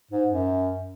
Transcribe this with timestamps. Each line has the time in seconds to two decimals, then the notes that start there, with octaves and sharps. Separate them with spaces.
0.11 G#2
0.31 F#2